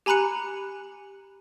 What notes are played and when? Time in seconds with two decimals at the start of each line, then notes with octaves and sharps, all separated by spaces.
0.06 G4 G#5 A#5 B5 F#6 C#7